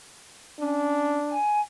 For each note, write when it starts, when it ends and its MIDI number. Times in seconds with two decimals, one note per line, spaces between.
0.60 1.20 61
0.60 1.37 62
1.30 1.60 80